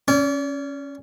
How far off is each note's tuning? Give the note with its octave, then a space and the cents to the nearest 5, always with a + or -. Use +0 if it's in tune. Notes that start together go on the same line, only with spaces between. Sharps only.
C#4 +0 D5 -40